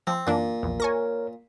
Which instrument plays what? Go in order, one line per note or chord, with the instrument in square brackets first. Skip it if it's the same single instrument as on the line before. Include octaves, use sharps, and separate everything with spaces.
[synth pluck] F3 [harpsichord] C4
[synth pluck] F#2 E3 D4 [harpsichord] A#2
[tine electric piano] A#1 [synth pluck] E2
[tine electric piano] A#4 C#5 [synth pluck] G#5 C#6 A#6